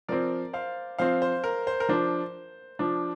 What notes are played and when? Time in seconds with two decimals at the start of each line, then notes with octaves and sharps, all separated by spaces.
0.08 F3 C4 A#4 D5
0.53 C5 F5
0.99 F3 C4 C5 F5
1.22 C5
1.44 A#4
1.67 C5
1.80 A#4
1.89 F3 D4 C5
2.79 F3 D4